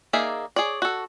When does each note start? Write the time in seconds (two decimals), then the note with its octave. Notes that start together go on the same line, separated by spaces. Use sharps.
0.13 A#3 D#4 G#4 D5 E5
0.56 G#4 C#5 D5
0.82 F#4 A4